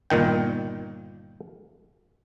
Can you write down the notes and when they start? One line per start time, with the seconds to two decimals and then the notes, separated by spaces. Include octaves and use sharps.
0.10 G1 A#2 D#3 G5